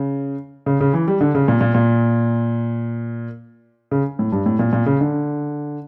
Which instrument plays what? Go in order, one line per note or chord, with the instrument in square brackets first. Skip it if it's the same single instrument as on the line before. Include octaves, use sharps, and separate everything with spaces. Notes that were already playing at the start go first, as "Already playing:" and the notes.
Already playing: [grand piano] C#3
C#3
C#3
E3
G3
D3
C#3
A#2
A#2
A#2
C#3
A2
G2
A2
A#2
A#2
C#3
D3